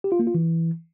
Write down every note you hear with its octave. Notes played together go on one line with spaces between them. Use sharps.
G4
F4
A#3
F4
E3